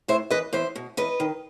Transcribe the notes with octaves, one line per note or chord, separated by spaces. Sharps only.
A2 C5 E5
E3 B4 D#5
E2 C5 E5
B2
E2 B4 D#5
D#3